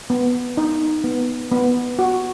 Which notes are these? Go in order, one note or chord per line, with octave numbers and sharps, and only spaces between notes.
B3
D#4
B3
B3
F#4